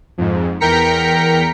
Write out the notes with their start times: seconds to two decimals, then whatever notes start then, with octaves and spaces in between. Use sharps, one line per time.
0.18 F2 G#2
0.60 E2 A#4 G5 A#5 B6 C#7